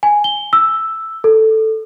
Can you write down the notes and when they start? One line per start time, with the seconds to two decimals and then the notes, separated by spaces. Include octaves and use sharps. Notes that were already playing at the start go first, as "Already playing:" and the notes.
0.03 G#5
0.24 G7
0.53 E6
1.24 A4